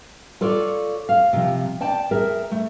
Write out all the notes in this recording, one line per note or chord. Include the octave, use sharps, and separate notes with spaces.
F4 A4 C#5 D5
F5
C3 F3
D5 G5 A5
G#4 A#4 E5
A3